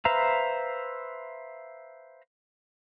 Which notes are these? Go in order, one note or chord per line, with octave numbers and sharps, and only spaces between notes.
B4 C5 E5 F5 A#5